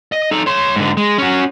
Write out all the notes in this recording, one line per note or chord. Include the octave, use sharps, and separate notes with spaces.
D#5
D#4 A4
C#5 C6
G#2 D3
G#3
C#4 F#4